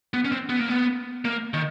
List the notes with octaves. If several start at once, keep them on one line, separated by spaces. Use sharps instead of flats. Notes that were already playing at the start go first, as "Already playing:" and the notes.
B3
C#4
C4
B3
A#3
B3
A#3
D#3